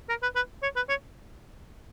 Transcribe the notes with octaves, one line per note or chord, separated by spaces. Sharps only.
A#4
B4
B4
C#5
B4
C#5